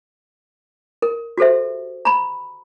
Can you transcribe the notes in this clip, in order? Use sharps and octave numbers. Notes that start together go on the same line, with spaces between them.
A#4
F#4 G4 A4 C5 E5
A#5 B5